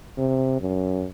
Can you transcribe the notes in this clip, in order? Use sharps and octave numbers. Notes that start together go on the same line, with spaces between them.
C3
F#2